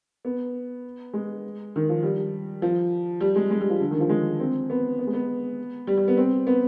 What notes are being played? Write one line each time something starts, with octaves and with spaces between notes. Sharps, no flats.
B3
G#3
D#3
F3
G3
F3
G3
G#3
G#3
G3
F3
D3
D#3
F3
G#3
C4
B3
B3
G#3
B3
G3
G3
B3
C4
B3